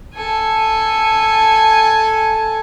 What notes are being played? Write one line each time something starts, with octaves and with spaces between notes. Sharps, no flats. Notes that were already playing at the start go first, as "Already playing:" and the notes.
A4 G#5